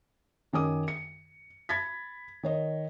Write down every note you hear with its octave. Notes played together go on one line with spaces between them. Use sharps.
F#2 D#3 C#4 G#5 D6 D#6
C#7
B5 G#6 A6 B6
D#3 C#5 D#5